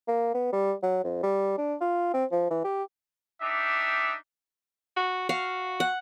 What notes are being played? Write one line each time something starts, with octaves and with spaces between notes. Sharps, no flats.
A#3
B3
G3
F#3
F2
G3
D4
F4
C4
F3
E3
G4
D4 D#4 G4 E5
F#4
F#4 F5
F#5